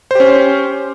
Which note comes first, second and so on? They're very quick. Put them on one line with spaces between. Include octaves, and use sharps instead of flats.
C5 G4 C#4